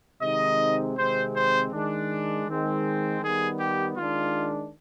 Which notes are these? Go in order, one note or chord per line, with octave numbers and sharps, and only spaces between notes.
C3 D#3 G#3 C4 D#4 D#5
C3 D#3 G#3 C4 C5
C5
D#3 G#3 D4
D#3 G#3 C4
D#3 G3 B3 G#4
G4
D#3 G#3 D4 F4